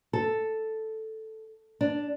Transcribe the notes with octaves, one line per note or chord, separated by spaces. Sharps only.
A4
D4